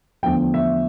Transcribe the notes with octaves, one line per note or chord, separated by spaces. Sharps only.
E2 D3 F3 A3 G5
E5